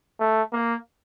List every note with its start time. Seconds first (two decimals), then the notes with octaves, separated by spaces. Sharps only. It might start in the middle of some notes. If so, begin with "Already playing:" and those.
0.20 A3
0.53 A#3